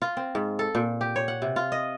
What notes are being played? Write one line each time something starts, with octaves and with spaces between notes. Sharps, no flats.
F4
C4
G#2
A4
A#2
G4
C#5
F#5
C3
F4
D#5